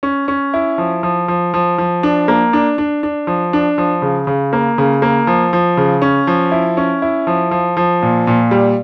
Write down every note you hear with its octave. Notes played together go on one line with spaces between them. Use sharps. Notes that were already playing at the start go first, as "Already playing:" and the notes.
C#4
C#4
E4
F3
F3
F3
F3
F3
D4
A#3
D4
D4
D4
F3
D4
F3
C#3
C#3
A#3
C#3
A#3
F3
F3
C#3
C#4
F3
E4
C#4
E4
F3
F3
F3
A#2
A#2
G3